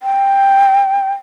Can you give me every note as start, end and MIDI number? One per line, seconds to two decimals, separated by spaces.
0.02 1.13 79